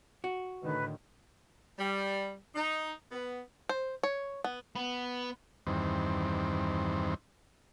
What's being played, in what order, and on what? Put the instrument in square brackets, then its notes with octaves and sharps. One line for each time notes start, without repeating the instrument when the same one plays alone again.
[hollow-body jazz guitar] F#4
[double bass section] A2 D3 D#3 [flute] B4
[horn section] G3
D#4
B3
[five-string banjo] C5
C#5
B3
[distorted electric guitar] B3
[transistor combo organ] E2 G2 D#3 C4